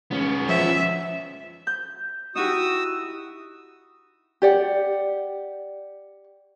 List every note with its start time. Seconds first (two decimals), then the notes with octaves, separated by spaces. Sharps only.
0.11 C#2 B3 C#4
0.49 F3 E5
1.67 G6
2.35 D#4 E4 F#4 G4 D#6 E6
4.42 G4 D5 F#5